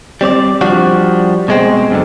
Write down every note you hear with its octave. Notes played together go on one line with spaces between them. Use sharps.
G3 C4 C#5 D5
F3 G3 D4 F#4
B2 G#3 C4
F#2 D3